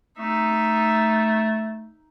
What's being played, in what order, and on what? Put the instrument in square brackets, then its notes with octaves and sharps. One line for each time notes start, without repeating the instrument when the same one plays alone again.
[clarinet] A3 [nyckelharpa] D#4 E5